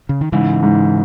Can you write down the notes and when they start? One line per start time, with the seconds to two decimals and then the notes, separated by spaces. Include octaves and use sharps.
0.09 C#3
0.21 D#3
0.32 G#2 C#3 E3
0.63 G#2